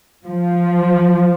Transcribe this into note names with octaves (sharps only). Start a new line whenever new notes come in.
F3